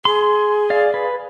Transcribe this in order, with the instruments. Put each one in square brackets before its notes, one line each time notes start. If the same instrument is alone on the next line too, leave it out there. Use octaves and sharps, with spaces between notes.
[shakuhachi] G#4 [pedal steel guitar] C6
[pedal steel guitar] D5 F5
B4